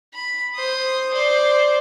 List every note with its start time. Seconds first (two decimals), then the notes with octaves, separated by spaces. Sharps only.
0.14 B5
0.55 C5 D#6
1.14 C5 D5